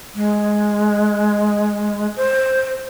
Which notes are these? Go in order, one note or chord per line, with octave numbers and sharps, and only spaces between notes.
G#3
C5